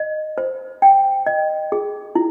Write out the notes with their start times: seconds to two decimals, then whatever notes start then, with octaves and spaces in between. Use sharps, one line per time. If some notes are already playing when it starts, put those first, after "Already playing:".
Already playing: D#5
0.38 C5
0.82 G5
1.26 D#5
1.72 G#4
2.15 E4